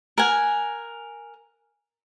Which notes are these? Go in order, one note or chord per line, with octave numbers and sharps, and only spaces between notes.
A#4 F#5 G#5